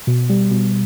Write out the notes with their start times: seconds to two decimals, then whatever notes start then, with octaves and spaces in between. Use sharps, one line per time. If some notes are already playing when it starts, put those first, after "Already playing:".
0.07 B2
0.29 G3
0.51 B2